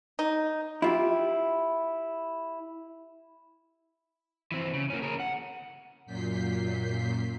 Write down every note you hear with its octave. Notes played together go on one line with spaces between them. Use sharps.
D#4
E4 F4 G4
E3 C4
C#3
A#3 C#4
G#4 A#4
F#5
F#2 A#2 G6 B6 C7